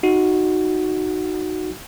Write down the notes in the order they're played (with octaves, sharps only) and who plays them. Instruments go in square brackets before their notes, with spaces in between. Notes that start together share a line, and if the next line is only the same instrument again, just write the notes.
[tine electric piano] D#4 F#4